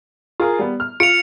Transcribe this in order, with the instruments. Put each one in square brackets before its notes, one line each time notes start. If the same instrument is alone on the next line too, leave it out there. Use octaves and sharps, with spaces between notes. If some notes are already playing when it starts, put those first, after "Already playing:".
[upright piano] F4 G#4 A#4
G3 B3
F6
[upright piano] F4 D7 [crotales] C#7 F7